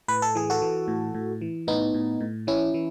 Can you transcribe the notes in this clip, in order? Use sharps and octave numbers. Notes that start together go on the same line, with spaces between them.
A2 B4
A4
E3 G#4
F#4 A4
E3
A2
A2
E3
A2 B3 D#4
A2
A2
E3 C#4 E4
E3